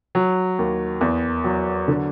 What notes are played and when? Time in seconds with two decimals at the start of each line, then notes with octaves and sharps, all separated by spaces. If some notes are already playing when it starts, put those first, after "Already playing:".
0.15 F#3
0.59 D#2
1.01 E2
1.44 F#3
1.88 D3